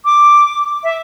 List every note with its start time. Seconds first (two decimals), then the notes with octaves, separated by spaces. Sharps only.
0.05 D6
0.83 E5